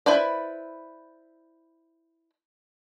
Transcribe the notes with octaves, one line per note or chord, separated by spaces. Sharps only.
E4 B4 C5 D5